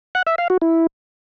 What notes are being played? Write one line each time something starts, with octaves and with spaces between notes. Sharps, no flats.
F#5
E5
F5
F#4
E4